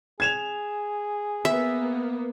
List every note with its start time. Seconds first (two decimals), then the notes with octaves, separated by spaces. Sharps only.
0.20 G#4 G#6 E7 F7
1.45 A#3 B3 E5